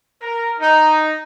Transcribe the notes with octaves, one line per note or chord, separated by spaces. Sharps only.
A#4
D#4